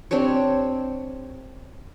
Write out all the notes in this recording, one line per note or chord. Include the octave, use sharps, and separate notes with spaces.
C4 D4 G4 C#5